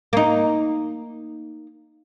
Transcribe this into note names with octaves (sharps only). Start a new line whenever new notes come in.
A#3 D#4